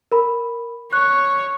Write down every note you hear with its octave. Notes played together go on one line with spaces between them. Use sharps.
A#4 B5
C#5 C#6 F#6